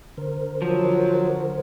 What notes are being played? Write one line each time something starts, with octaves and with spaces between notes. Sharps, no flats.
D3 A#4 C5
F3 F#3